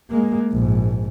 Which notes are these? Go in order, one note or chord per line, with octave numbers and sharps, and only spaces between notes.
G#3 A#3
A#1 G#2